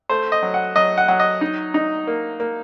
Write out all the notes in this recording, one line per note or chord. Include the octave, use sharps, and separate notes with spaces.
A3 C5
D#5
F#3
F#5
F#3 D#5
F#5
F#3 F#5
D#5
D#4
D#4
A#3
A#3